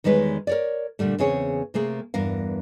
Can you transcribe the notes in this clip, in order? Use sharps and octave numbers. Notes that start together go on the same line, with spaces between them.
E2 D#3 G3 G#3 B4 C#5
A#4 C#5 D5
A#2 D3 G3 A3
E2 C#3 C4 G#4 C#5
C3 A3 A#3 G#4
E2 G2 A#4 F5